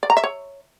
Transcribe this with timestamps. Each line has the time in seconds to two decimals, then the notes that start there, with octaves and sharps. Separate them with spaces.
0.03 D5
0.10 A#5
0.17 E5
0.24 C#5